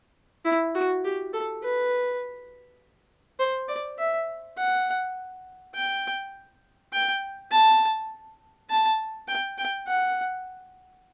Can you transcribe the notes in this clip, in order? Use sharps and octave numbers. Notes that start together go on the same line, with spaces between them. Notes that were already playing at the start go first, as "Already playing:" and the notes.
E4
F#4
G4
A4
B4
C5
D5
E5
F#5
G5
G5
A5
A5
G5
G5
F#5